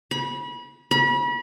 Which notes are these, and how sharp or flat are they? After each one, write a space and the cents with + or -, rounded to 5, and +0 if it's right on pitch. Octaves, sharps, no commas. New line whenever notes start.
B5 -30
B5 -35